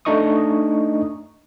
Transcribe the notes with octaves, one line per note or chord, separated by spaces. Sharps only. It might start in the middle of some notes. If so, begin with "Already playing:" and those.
A3 D4 D#4 D#5 C#6 D#6